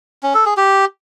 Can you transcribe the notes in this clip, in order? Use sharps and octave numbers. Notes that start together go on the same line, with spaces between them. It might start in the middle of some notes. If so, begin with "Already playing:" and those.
C#4
A4
G#4
G4